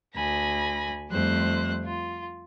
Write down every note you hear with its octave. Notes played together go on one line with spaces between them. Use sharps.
D2 G#5 B5 A#6
F2 G3 A3 C5 F#6
F4